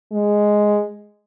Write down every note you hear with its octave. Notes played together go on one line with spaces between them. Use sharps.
G#3